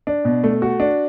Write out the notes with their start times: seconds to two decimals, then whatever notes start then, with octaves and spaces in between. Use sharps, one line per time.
0.07 D4
0.25 B2
0.44 A3
0.62 F#4
0.80 D4